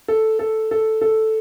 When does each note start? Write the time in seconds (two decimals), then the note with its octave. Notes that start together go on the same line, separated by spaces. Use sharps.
0.08 A4
0.39 A4
0.71 A4
1.01 A4